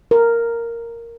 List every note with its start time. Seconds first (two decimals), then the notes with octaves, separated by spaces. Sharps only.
0.11 A#4